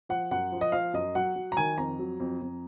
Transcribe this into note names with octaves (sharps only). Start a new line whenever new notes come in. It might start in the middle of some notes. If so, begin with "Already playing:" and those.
F3 F#5
F#2 F#5
F3
D#5
F3 F5
F#2 D#5
F#3 F#5
F#3
A#5
D#3 G#5
F2 A#5
F#3
F2
F2